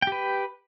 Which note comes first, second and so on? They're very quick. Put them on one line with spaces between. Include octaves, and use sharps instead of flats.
G5 G4 B4